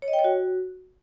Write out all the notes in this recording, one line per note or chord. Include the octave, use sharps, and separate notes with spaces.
C#5
D#5
G5
C#5
F#4